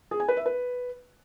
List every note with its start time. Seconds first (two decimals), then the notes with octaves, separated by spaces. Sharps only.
0.11 G#4
0.20 G#5
0.28 B4
0.37 E5
0.46 B4